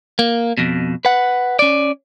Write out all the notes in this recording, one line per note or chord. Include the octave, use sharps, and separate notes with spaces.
A#3
F2 B2
B4 F#5
C#4 D5